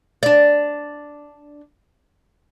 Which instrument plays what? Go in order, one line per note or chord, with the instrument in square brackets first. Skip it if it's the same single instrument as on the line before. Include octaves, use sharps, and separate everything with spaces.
[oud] D4 D5